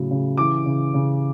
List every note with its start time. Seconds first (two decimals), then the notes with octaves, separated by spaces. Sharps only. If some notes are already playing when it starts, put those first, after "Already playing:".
Already playing: A2 C#3 F#3
0.11 C#3
0.37 E3 D6
0.66 C#3
0.94 C#3